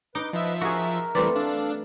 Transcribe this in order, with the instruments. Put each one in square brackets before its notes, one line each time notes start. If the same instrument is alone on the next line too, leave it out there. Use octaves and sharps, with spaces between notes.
[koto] D#4 [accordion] B4 [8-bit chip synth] D6 G6
[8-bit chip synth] F3 E5 [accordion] B4 D#5
[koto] F#4 G#4 [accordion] A#4
[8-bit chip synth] E3 G3 [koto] A3 C4 D5 [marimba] B4
[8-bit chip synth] D4 [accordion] A4 F5